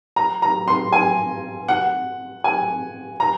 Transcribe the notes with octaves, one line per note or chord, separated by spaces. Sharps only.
A#5
A#5
C6
G#5
F#5
G#5
A#5